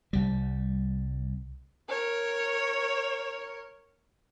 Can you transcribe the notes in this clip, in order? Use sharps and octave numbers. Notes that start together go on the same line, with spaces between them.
C2 G3
A#4 C#5